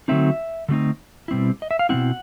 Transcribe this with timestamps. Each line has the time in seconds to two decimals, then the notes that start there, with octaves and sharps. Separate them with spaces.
0.08 D3 F#3 A3 C4 D#4 E5
0.69 D3 F#3 A3 C4 D#4
1.28 B2 G3 C4 E4
1.62 D#5
1.71 E5
1.79 F5
1.89 B2 G3 C4 E4 F#5